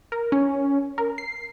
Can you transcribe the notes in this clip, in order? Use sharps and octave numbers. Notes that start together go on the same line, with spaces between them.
A#4
C#4
A#4
C7